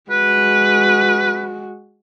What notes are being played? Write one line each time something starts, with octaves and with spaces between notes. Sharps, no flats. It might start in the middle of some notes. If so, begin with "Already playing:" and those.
G#3 F#4 B4